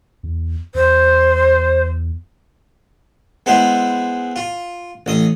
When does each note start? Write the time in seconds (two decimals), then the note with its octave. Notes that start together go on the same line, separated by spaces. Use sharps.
0.23 E2
0.75 E2 C5
3.46 G#3 B3 E4 C5
4.36 F4
5.06 A1 D#5 D#6